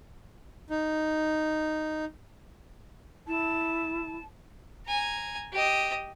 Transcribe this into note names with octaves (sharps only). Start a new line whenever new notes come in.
D#4
E4 A5
G#5 A#5
G4 D#5